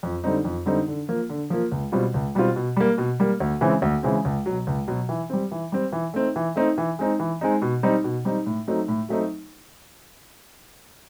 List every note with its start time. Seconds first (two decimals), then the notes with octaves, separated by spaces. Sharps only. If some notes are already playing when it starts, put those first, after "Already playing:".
0.03 F2
0.24 D3 G3 C4 D#4
0.45 F2
0.66 D3 G3 C4 D#4
0.88 D3
1.08 F3 A#3
1.30 D3
1.50 F3 A#3
1.72 C#2
1.92 B2 G3 C4 F4
2.14 C#2
2.35 B2 G3 C4 F4
2.56 B2
2.77 G3 A#3
2.98 B2
3.20 G3 A#3
3.40 D2
3.61 C#3 E3 G#3 C4
3.82 D2
4.03 C#3 E3 G#3 C4
4.25 C#2
4.46 B2 F#3
4.67 C#2
4.88 B2 F#3
5.09 E3
5.30 G3 C4
5.52 E3
5.72 G3 C4
5.92 E3
6.14 A3 C4 D#4
6.36 E3
6.56 A3 C4 D#4
6.78 E3
6.99 G#3 C4 D#4
7.20 E3
7.41 G#3 C4 D#4
7.62 B2
7.83 G3 C4 D#4
8.04 B2
8.25 G3 C4 D#4
8.46 A2
8.68 F#3 A3 C4 D#4
8.88 A2
9.09 F#3 A3 C4 D#4